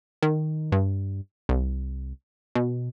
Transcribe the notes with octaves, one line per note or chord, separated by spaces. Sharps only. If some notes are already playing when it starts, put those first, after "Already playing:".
D#3
G2
C2
B2